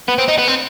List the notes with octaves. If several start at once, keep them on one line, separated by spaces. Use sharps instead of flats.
B3
C4
D#4
B3
C4